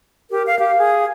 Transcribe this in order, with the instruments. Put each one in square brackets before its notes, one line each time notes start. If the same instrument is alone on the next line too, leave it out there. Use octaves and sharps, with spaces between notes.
[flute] G4 [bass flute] A#4
[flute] F5
[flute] G4 [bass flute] F5
[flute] G#4